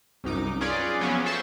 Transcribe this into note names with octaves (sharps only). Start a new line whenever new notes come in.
C2 F#2 D#4 D6
C#4 F4 G#4 B4 D5
F3 F#3 B3 C#4
A4 C5 E5 C#6 E6